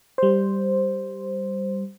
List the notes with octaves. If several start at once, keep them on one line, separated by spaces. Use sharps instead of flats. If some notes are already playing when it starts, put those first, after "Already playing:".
G3 C5